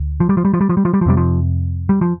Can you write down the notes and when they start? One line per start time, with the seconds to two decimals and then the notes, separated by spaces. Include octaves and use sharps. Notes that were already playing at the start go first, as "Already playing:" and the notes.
Already playing: D2
0.20 F3
0.29 G3
0.37 F3
0.45 G3
0.54 F3
0.61 G3
0.69 F3
0.77 G3
0.85 F3
0.94 G3
1.01 F3
1.06 F2 C3 G3
1.17 F3
1.89 G3
2.01 F3